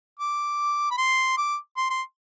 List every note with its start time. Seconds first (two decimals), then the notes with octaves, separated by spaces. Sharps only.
0.19 D6
0.91 B5
0.98 C6
1.38 D6
1.77 C6
1.90 C6